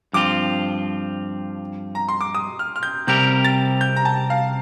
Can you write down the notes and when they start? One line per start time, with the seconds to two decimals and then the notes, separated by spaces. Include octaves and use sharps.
0.13 G2 F3 C4 F4 D6
1.95 A#5
2.09 C6
2.21 D6
2.35 D#6
2.59 F6
2.76 F6
2.83 G6
3.07 C3 G3 C4 G4 A#4 G6
3.44 A6
3.81 G6
3.96 A#5
4.05 A5
4.30 F5